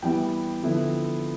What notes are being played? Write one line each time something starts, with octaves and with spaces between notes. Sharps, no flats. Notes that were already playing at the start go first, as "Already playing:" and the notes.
E3 G3 B3 E4 G5
D3 F3 B3 E4